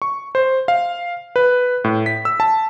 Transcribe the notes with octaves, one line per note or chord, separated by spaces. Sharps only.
C#6
C5
F5
B4
A2
B6
E6
A5